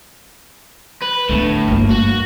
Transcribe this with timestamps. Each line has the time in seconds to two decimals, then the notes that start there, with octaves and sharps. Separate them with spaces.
1.02 B4
1.29 A2 D3 B3
1.68 G1 A#3
1.91 F#4